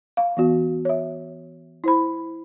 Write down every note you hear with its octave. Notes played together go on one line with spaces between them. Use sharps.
F5
E3 B3 F#4
C#5 E5
E4 C5 B5